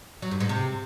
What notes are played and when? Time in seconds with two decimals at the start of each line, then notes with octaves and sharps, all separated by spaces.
0.22 F#3
0.31 G2
0.40 G#2
0.49 C3